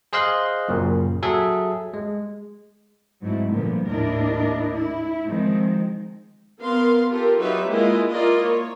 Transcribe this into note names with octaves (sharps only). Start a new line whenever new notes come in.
G#4 C5 D#5 F5 C6 F#6
F#2 A#2 C#3
F#3 G#4 A4 E5
G#3
G#2 F#3 A3 C4 E4
A#2 D3 F3 G3 B3
D#2 A2 D4 E4 A#4 D#5
E4
D#3 F3 G#3 C4
B3 A#4 F5 C6
F4 G4 A4 A#4
F#3 D#4 F4 G4 B4 E5
G#3 A#3 E4 F4 D#5
E4 F4 A#4 D5 D#5
A#3 C#5